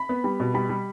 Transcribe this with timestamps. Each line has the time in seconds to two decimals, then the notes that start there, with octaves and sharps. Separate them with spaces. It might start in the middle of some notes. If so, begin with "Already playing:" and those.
Already playing: B5
0.09 B3
0.24 G3
0.40 B2
0.54 G3 B5
0.69 G3